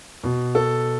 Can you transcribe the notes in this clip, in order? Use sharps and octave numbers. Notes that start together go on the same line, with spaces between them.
B2
A4